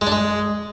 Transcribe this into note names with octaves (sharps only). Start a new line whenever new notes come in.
G#3
D4
G#3